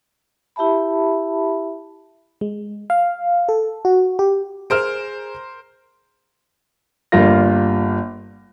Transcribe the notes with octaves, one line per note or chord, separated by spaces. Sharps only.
E4 G4 E5 A5 B5
G#3
F5
A4
F#4
G4
G#4 A#4 C5 F6 D7
G1 G3 A#3 F4 A#6